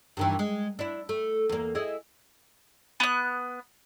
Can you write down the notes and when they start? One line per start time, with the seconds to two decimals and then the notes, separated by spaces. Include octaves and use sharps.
0.17 G2 D#3 E3
0.39 G#3
0.79 D4 E4
1.09 A3
1.49 E2 A#3
1.75 E4 G#4 D#5
3.00 B3 F#6